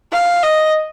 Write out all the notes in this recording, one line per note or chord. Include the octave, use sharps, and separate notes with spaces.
F5
D#5